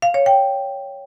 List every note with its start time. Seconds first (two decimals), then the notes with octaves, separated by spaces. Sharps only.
0.02 F5
0.14 C#5
0.26 G5